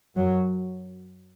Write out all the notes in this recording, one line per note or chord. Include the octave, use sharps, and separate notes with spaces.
F#2 F#3